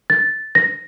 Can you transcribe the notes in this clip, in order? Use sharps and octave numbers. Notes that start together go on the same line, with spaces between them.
A6
A#6